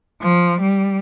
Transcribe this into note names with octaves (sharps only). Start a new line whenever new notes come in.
F3
G3